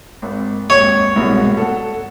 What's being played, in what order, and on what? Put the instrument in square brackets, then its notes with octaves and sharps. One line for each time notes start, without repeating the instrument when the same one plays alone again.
[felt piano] G#1
[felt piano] G#1 D#2 [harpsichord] C#5
[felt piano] C2 G#2 B2
A4 F#5